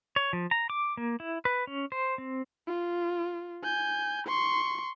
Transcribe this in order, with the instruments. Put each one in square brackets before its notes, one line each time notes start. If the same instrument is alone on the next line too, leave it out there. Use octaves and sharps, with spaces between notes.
[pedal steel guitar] C#5
F3
A#5
D6
A#3
E4
B4
C#4
C5
C4
[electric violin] F4
G#5 G6
C6 C#6